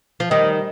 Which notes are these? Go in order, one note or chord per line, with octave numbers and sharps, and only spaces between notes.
F3
D#3 G3 D#5